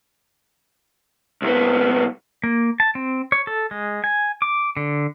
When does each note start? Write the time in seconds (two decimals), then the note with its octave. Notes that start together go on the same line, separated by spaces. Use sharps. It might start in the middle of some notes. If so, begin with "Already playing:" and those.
1.42 C2 B3
2.44 A#3
2.80 A5
2.95 C4
3.32 C#5
3.47 A4
3.71 G#3
4.04 G#5
4.42 D6
4.77 D3